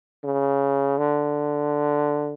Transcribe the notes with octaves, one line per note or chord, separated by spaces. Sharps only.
C#3
D3